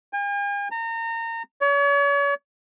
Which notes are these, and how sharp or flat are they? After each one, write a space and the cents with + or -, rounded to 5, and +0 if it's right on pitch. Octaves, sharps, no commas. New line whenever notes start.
G#5 -45
A#5 -30
C#5 +40